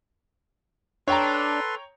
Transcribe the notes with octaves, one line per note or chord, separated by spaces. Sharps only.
D4 A4 B4 C#5 G5 A#5 C6